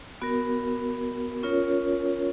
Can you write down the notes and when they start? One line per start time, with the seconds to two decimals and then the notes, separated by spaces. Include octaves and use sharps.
0.22 B3 F#4 A#4
1.43 C#4 F4 A#4 C#5